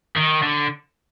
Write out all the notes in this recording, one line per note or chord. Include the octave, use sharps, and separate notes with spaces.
D#3
D3